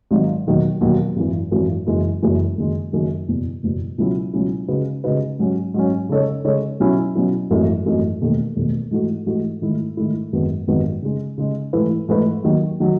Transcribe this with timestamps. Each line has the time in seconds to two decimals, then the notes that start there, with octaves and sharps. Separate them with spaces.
0.11 G#1 G#2 D#3 F#3
0.46 E1 D#2 D#3 F#3
0.81 E1 D#2 D#3 F#3
1.16 G#1 F#2 E3
1.51 G#1 F#2 E3
1.87 F#1 F#2 E3 G#3 D#4
2.22 F#1 F#2 E3 G#3 D#4
2.57 F#1 F#2 D#3 G#3
2.92 F#1 F#2 D#3 G#3
3.28 F#1 E2 B2
3.63 F#1 E2 B2
3.98 C#2 B2 F#3 C#4 E4
4.33 C#2 B2 F#3 C#4 E4
4.68 C#3 G#3 D#4 F#4 B4
5.04 C#3 G#3 D#4 F#4 B4
5.39 G#2 F#3 C#4
5.74 G#2 F#3 C#4
6.09 C#3 G#3 D#4 A4 C#5
6.45 C#3 G#3 D#4 A4 C#5
6.80 B2 F#3 C#4 E4
7.15 B2 F#3 C#4 E4
7.50 G#1 F#2 E3 A3 D#4
7.85 G#1 F#2 E3 A3 D#4
8.21 E1 D#2 D#3 A3
8.56 E1 D#2 D#3 A3
8.91 G#2 E3 A3 D#4 F#4
9.26 G#2 E3 A3 D#4 F#4
9.62 G#2 D#3 A3 E4
9.97 G#2 D#3 A3 E4
10.33 G#1 F#2 D#3 G#3 B3
10.67 G#1 F#2 D#3 G#3 B3
11.02 C#3 G#3 D#4
11.38 C#3 G#3 D#4
11.73 G#2 E3 A3 E4 B4
12.08 G#2 E3 A3 E4 B4
12.43 D#2 D#3 F#3
12.80 D#3 F#3